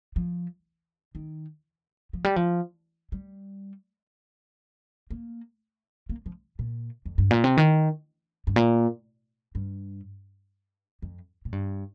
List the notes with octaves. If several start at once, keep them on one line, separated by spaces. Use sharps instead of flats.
F3
D#3
F3
G3
F3
G3
A#3
A#3
F3
A#2
F2
G2
A#2
C3
D#3
G2
A#2
G2
F2
A#2
G2